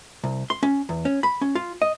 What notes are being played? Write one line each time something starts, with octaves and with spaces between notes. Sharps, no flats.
C2
C6
C#4
E2
C#4
B5
C#4
F4
D#5